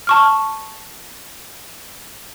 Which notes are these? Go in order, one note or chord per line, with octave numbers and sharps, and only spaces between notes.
A5 C#6 F6